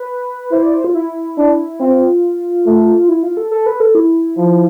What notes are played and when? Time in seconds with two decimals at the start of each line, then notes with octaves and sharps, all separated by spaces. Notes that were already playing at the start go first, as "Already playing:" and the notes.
Already playing: B4
0.52 E4 C5
0.63 D5
0.74 C5
0.84 F4
0.95 E4
1.38 D4
1.81 C4 F4
2.66 A3
3.09 E4
3.23 F4
3.37 A4
3.51 A4
3.66 B4
3.80 A4
3.95 E4
4.37 F3